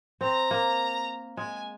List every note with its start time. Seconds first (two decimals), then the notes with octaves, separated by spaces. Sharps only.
0.21 C4 A#5
0.51 A#3
1.37 G#3 G#5